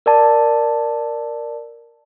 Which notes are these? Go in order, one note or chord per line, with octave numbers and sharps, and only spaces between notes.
A#4 D5 A5